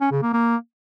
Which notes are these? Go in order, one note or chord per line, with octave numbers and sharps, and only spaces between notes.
C#4
C#3
A#3
A#3